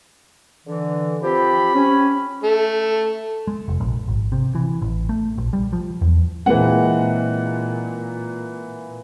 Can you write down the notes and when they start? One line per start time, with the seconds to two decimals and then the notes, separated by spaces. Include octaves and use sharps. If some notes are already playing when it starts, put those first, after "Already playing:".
0.67 D3 E3
1.23 F3 C4 G4 B5
1.75 C#4
2.43 A3
3.47 G#3
3.68 F1
3.80 A#1
4.08 G#1
4.32 C3
4.55 E3
4.82 A1
5.09 A3
5.38 A#1
5.53 G3
5.73 F3
6.01 E2
6.46 A#2 E3 G#3 A#3 C4 F#5